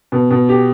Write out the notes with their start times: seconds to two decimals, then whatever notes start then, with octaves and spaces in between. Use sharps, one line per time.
0.12 B2
0.31 B2
0.49 G4